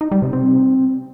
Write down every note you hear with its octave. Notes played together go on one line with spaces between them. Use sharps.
D#4
G3
C3
C4